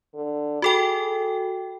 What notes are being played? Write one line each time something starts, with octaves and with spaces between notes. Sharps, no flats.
D3
F#4 G#4 A4 G5